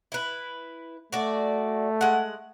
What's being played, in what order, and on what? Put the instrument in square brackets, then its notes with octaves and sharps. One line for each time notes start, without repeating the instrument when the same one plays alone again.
[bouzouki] E4 B4
[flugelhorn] A3 [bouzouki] F#4 D5
[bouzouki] G#3 F#5